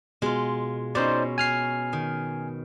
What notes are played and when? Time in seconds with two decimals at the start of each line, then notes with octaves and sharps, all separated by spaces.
0.22 B2 G#3 F4
0.95 B2 C#4 D#4 C5 D5 C6
1.38 G#5 F6 C7
1.93 D#3